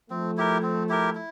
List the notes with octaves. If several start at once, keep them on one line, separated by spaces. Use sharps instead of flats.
F3 A3 C4
E4 G4 A#4
C4
E4 G4 A#4
E4